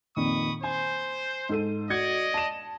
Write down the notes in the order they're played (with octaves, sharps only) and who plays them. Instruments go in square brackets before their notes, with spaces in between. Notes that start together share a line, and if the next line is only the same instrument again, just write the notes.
[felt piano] F2 A#2 D#3 [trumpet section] B5 C#6 D#6
[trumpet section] C5 [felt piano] G#5
[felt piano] G#2 A4 D#7
[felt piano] F#4 G#6 C#7 [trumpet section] D5 D#5
[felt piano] A5 E7